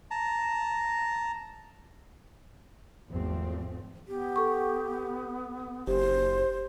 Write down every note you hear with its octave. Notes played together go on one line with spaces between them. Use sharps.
A5 A#5
G#1 E2 F3 A3 C4
B3 G4
A4 C#6
F#1 G4 C5